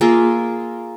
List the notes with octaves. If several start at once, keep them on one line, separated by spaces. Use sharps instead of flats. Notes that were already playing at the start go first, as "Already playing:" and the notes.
A#3 F4 G#4 E5